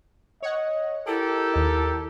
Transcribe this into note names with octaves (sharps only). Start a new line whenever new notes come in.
C#5 D#5 F#5
E4 G4 A4 A#4
D#2 D#4